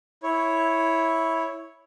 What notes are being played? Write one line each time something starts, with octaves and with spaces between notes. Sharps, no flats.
E4 C#5